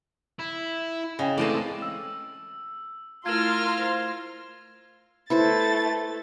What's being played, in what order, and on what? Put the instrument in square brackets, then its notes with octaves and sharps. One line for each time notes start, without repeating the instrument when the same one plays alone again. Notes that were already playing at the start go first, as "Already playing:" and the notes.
[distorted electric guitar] E4
[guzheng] C#3 [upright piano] D#5 G5
[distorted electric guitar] A2 C4 [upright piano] E3 G#3 A3 [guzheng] D5 D#5 A5
[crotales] E6
[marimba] A3 E4 [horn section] F4 [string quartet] A#4 C6 F6 [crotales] G#6 E7
[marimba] C5
[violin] A3 A6 [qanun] E4 B4 C5